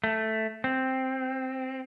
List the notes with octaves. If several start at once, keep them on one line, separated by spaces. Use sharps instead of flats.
A3
C4